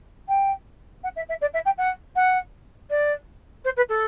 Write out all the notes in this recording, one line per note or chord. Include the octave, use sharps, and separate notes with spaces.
G5
F#5
E5
E5
D5
E5
G5
F#5
F#5
D5
C5
B4
A4